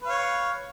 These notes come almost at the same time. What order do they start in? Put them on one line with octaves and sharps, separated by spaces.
B4 F5 C#5